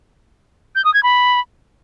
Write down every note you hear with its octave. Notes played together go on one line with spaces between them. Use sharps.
G6
D#6
G#6
B5